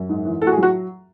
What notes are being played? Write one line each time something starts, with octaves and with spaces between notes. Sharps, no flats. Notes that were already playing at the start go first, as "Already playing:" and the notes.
Already playing: F#2
G#2
E3
A2 A4
F#4
G#4
F#3
F#4